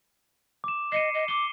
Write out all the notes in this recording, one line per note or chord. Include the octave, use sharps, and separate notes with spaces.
D6 E7
D#5 C7 C#7 D#7
D#5
D6 G7